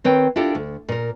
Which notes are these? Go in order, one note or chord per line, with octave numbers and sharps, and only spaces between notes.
D#3 C4 B4 C#5 G5
D4 E4 F4 G4 A4 A#4
D2
A#2 A#4